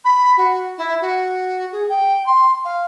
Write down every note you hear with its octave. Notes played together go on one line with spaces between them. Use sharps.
B5
F#4
E4
F#4
G#4
G5
C6
F5